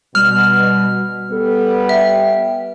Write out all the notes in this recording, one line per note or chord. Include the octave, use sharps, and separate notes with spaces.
B2 G3 F6
G3 B3 A4
E5 G5